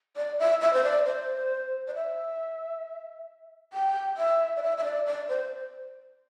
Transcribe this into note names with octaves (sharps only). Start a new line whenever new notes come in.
D5
E5
E5
C5
D5
C5
D5
E5
G5
E5
D5
E5
E5
D5
D5
C5